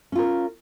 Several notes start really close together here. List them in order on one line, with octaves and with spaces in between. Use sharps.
C#4 F4 A#4